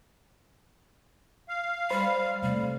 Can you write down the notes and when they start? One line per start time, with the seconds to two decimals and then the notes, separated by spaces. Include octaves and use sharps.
1.49 F5
1.90 G3 C5 B5
2.43 C3 G3 A3